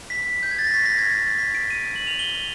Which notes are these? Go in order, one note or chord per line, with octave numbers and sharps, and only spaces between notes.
B6
G6
G#6
A6
A#6
C#6 F6 B6
A#6
G#6
A6
A#6
B6
D7
D#7
F#7
F7
G7